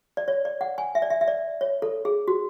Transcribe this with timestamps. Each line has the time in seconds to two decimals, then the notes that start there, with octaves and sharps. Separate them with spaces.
0.17 D5
0.28 C#5
0.45 D5
0.61 F#5
0.78 G#5
0.95 E5
1.02 D5
1.10 E5
1.21 E5
1.28 D5
1.61 C#5
1.82 A4
2.05 G#4
2.28 F#4